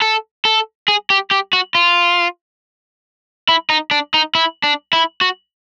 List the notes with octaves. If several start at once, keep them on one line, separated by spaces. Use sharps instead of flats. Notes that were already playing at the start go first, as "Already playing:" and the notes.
A4
A4
G#4
G4
G4
F#4
F4
E4
D#4
D4
D#4
E4
D4
E4
F#4